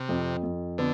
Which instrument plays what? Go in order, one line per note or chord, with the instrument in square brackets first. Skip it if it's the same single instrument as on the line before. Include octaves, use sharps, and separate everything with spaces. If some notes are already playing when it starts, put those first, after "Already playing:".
Already playing: [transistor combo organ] C3
[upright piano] F2
F2
[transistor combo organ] D3 [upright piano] B3